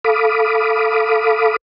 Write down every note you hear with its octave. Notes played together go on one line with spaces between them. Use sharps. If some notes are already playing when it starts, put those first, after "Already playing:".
A4 F5 B5 D6 D#6